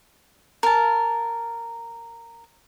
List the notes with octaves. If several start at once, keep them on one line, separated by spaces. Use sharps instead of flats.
A#4 A5